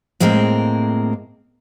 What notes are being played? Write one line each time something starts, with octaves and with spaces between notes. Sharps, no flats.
A2 G#3 A#3 C4 A#4